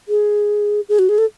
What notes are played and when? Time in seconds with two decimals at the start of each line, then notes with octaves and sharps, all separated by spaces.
0.09 G#4
0.89 G#4
0.99 F#4
1.09 G#4
1.18 A4